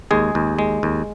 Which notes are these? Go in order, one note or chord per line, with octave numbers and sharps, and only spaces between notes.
D#2 G#3 G#4
D#2
G#3
D#2